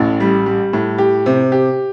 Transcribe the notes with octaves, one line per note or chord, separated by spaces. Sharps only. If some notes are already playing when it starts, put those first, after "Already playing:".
Already playing: A1 A2
G3
G3
A2
G4
C3
G4